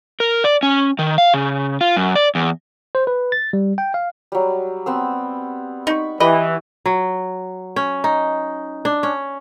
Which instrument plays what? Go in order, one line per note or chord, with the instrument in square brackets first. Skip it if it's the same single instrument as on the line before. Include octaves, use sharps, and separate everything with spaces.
[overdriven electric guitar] A#4
D5
C#4
D#3
F5
C#3
F4
F#2
D5
E2
[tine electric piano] C5
B4
A6
G3
G5
F5
[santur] F#3 G3
B3 C4 E6
[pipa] D#4 [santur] B5 C#6
[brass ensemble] E3 [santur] G4 [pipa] B4 D#5
[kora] F#3
C#4
D#4
D4
C#4